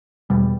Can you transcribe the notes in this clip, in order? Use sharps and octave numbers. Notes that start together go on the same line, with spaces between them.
E2 B2 G3